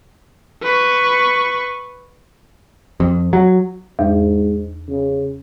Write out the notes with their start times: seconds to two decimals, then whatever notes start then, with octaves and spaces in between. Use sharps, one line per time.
0.63 B4 C#6
3.00 F2
3.33 F#3
3.99 E2 G#2
4.89 C#3